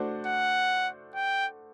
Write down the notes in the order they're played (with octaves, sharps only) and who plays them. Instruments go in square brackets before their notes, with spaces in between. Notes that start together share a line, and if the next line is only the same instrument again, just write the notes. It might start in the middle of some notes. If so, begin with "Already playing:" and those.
Already playing: [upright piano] A3 D4 F#4 C5
[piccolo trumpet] F#5
G5